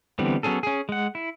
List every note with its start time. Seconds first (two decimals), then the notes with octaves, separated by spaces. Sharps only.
0.19 D3 E3 G3 B3 C4
0.43 F#3 B3 C#4 G#4 A4
0.63 C#4 G#4
0.89 G#3 F#5
1.15 E4